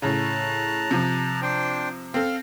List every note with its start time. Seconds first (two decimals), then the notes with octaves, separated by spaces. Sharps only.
0.02 A2 C#3 A5 A#5 F#6
0.91 C3 F3
1.42 D4 C5 G5
2.14 C4 A4 F5